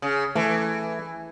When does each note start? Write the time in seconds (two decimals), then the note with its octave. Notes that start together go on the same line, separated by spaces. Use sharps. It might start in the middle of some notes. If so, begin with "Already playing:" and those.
0.02 C#3
0.35 E3 A3